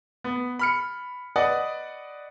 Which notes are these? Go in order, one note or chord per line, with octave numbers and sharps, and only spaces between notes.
B3
B5 F6 C#7
B4 D5 D#5 F#5 D#6